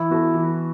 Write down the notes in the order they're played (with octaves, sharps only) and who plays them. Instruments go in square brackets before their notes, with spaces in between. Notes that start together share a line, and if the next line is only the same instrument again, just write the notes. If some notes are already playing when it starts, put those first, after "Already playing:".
Already playing: [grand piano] E3 [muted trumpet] E4
[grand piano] B3 F#4 A4
E3